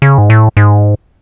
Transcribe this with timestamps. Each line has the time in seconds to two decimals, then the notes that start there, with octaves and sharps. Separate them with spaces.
0.02 C#3
0.18 G#2
0.30 A2
0.57 G#2